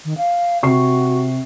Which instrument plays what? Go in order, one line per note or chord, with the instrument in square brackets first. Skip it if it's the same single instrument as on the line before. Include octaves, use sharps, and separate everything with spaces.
[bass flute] D#3
F5
[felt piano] C3 C#6 C7 [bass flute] F#4